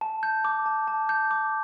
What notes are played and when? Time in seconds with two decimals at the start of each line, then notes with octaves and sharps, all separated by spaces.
0.01 A5
0.23 G6
0.45 D6
0.66 A5
0.88 A5
1.09 G6
1.31 D6